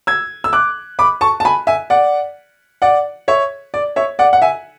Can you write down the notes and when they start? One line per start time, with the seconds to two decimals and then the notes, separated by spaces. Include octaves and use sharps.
0.07 E6 G#6
0.44 E6
0.53 D6 F#6
0.99 B5 D6
1.21 A5 C#6
1.40 A5
1.45 G#5 B5
1.67 E5 G#5
1.90 D5 F#5
2.82 D5 F#5
3.28 C#5 E5
3.74 D5
3.96 C#5 E5
4.19 D5 F#5
4.33 F#5
4.42 E5 G#5